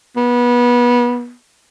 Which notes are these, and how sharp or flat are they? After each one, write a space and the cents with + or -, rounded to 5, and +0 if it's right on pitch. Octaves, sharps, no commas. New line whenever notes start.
B3 -25